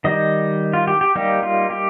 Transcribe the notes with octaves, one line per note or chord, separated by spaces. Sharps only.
D#3 G3 D#4 D#5
F4
G4
G4
G3 A#3 D#4 G4
F4
G4